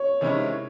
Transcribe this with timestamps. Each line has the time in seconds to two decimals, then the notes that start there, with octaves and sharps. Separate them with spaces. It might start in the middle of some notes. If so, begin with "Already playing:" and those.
Already playing: C#5
0.21 C3 D#3 G#3 C#4 E4